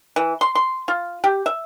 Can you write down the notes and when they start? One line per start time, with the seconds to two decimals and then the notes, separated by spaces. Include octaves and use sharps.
0.16 E3
0.41 C6
0.55 C6
0.88 F4
1.24 G4
1.46 E5